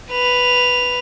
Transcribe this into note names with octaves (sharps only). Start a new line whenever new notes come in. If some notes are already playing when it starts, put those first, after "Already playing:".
B4 F7